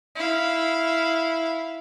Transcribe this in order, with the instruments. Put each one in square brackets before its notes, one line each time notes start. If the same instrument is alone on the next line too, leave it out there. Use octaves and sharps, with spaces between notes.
[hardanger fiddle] E4 F5